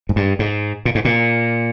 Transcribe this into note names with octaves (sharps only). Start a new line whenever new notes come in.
G#2
G2
G#2
A#2
G#2
A#2